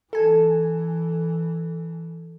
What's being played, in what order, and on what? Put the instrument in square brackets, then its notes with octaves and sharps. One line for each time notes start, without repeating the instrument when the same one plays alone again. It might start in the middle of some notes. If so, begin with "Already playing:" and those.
[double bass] E3 [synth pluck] A4 G#5